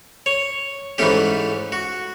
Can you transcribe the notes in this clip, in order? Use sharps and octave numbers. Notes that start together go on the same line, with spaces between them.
C#5
G#2 E3 A3 C#4 G4
F#4